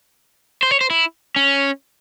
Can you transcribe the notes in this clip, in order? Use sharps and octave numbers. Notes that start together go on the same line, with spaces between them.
C5
C#5
C5
E4
C#4